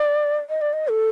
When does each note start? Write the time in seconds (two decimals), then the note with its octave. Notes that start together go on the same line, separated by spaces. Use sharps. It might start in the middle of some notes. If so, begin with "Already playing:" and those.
Already playing: D5
0.49 D#5
0.61 D5
0.73 D#5
0.88 A4